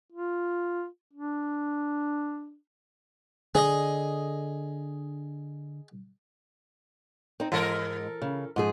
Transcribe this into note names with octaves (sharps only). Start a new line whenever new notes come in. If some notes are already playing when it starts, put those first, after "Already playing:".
F4
D4
D3 G#4 D#5
C4 D#4
G#2 E3 G#3 A4 A#4
C#3
G#2 F3 G#4